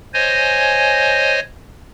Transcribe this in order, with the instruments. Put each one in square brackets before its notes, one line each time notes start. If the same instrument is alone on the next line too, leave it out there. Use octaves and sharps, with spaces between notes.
[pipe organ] C5 C#5 D#5 G#5